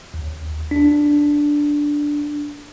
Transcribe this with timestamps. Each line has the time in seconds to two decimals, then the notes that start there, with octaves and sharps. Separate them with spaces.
0.14 D#2
0.71 D4